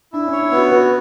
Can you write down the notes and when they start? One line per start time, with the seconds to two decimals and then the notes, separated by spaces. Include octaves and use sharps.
0.13 D4 E4
0.27 C#4
0.32 C#5
0.42 D4
0.51 B3 F#4
0.71 F#4 B4